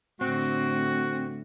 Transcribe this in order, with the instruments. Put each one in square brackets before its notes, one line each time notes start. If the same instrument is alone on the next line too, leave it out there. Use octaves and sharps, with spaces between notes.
[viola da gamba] A2 D3 [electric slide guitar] C4 [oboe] F#4